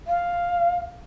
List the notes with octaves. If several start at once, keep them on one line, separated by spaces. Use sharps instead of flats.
F5